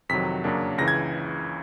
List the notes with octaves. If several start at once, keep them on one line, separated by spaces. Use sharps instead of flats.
F2 C3 D#3 F#3 B6
F#2 C#3 F#3 A#3 D4
C#2 C#3 E3 A#6
G#6